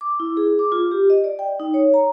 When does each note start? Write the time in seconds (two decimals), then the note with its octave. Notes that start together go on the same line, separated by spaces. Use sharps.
0.01 D6
0.20 E4
0.37 G#4
0.59 D6
0.72 F4
0.91 G4
1.10 D#5
1.24 D5
1.39 G5
1.60 D#4
1.74 C#5
1.94 A#5